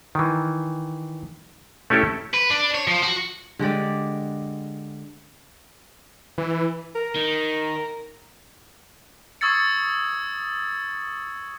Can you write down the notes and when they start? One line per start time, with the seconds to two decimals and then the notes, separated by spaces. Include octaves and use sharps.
0.15 D#3 E3
1.90 A3 C#4 E4 G4 A4 E5
2.34 B4
2.50 D4
2.75 C#5
2.88 F3
3.03 F#4
3.59 D3 G#3 G4 D5
6.38 E3
6.95 A#4
7.15 D#3
9.41 C#6 D#6 E6 G#6 A6 C#7